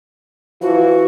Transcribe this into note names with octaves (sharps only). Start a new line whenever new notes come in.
E3 F3 F#4